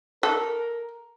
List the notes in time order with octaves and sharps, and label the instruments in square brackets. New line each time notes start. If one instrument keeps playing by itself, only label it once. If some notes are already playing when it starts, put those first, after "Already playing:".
[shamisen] A4 [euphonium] A#4